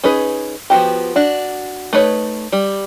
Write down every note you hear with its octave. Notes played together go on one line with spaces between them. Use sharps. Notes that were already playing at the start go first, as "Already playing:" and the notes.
C#4 D#4 G#4 B4
F3 B3 F#4 G4
D4 F#4
A3 D#4 B4 C#5
G3